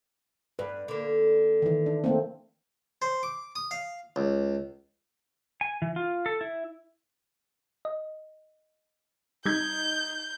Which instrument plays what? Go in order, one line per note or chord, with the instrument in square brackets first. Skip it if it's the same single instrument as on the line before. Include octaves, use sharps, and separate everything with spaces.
[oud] G2 [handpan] B4
[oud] D3 A#3
[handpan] D#3 E3
D4
A3 A#3 C4
[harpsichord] C5
D6
D#6
F5
C#2
[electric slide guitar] G#5
E3
F4
A4
E4
[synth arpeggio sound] D#5
[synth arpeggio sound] G3 [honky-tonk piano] D#4 G#6 [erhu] G6